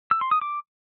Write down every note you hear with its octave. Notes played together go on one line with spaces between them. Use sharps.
E6
C6
D#6
D6